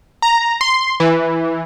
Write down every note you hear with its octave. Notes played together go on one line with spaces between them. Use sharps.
A#5
C6
E3